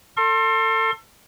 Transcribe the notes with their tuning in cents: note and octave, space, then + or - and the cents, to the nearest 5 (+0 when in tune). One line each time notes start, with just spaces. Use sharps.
A4 +30 C6 +30